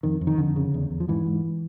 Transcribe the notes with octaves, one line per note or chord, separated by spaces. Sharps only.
F2 D#3
F2
D#3
F2 D3
C#3
E2
E2
F3
G#2 E3
G#2